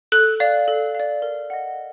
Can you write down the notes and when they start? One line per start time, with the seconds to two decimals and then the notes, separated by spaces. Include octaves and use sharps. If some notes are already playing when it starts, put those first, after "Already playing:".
0.12 A4 F#6
0.40 D5 F5
0.68 A4
0.95 D5 F5
1.22 A#4
1.50 D#5 F#5